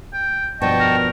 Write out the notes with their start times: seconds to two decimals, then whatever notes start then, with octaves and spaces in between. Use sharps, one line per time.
0.13 G5
0.61 G2 B2 F3 D#5 G5 A5 C#6
0.80 A#4